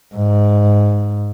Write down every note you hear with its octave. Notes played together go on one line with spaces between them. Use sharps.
G#2